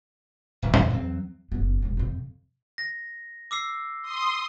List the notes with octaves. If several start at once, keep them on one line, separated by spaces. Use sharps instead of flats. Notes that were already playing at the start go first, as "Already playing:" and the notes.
D1 A#1 E3
E2 A#2 E3 F#3
E2 F#3 C4
F#1 B3
E1 G#2
F2 C3
A#6
D6 E6 C7
C6 D#6